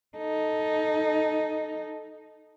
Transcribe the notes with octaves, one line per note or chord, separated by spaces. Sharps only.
D#4 A4